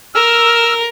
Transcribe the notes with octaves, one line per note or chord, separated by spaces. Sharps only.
A#4 E6 F6